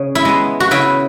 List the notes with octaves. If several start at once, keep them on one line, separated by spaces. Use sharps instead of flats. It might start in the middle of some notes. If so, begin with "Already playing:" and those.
Already playing: C#3
E4
G#3 B3
F#4
C#3 E4